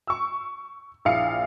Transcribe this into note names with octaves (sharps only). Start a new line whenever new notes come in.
C#6 E6
A#1 A#2 E4 F5 C7 C#7